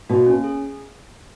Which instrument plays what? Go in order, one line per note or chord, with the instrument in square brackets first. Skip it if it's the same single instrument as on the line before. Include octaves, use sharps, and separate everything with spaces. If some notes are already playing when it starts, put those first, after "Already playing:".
[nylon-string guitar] B2 [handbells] A#3
[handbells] C#4
G#4